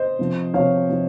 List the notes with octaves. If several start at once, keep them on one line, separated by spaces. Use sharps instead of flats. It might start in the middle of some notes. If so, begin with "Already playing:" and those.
Already playing: C5 D#5
C3 F3
C3 F3 C#5 F5
C3 F3